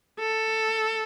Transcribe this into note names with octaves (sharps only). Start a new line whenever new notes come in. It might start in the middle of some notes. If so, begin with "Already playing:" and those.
A4